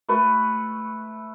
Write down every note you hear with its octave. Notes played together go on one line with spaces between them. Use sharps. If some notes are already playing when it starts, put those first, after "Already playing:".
A3 B4